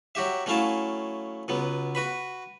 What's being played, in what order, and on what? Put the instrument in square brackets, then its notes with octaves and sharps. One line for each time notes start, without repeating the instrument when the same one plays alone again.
[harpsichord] F#3 F#4 G4 E5
F#3 A3 C#4 E4 F5 A5
C#2 F#3 B3
F#4 B4 B5